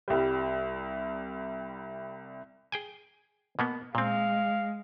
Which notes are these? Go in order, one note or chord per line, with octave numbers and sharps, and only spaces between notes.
C2 G3
G#4 G5 G#5
B2 A#3 B3
A#2 G#3 C4 F5